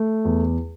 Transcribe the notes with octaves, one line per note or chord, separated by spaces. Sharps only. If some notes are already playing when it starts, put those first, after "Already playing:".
Already playing: A3
E2